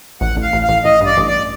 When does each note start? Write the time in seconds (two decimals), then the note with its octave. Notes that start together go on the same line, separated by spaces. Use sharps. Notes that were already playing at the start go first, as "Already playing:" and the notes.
0.21 A1 F#5
0.37 A1
0.42 F5
0.53 A1
0.63 F5
0.69 A1
0.85 A1 D#5
1.01 G2
1.06 D5
1.17 A1
1.28 D5